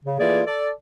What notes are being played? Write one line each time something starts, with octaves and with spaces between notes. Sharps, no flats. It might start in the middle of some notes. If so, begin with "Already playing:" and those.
C#3
E3 A3 A#3 F4 G#4 D5
A4 D5